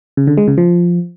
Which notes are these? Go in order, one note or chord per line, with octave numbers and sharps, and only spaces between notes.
C#3
D3
G#3
C#3
F3